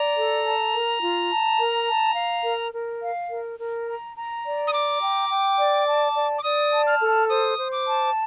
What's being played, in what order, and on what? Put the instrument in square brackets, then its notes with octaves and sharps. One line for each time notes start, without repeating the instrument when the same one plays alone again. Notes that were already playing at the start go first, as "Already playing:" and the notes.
Already playing: [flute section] D5 [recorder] A#5
[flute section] A4
A5
A#4
F4
A5
A#4
A5
F5
A#4
A#4
F5
A#4
A#4
A#5
A#5
D5
[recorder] D#6
[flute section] A#5 [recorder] D6
[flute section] G5
G5
D5
A5
D5
[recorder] D6
[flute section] D5 [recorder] D#6
[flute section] A5
[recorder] F6
[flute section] A4
[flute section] C5 [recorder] D#6
[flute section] C5
[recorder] D6
[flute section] A5